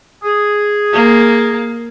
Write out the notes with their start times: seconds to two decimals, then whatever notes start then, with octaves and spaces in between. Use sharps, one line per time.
0.24 G#4
0.93 A#3